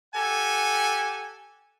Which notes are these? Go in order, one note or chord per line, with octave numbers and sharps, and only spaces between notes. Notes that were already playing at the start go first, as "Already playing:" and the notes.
G4 A4 F#5 G#5